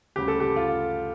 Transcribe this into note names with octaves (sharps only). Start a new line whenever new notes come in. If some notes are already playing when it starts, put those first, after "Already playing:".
D2 C#3 G3 G4
A4
G4
F4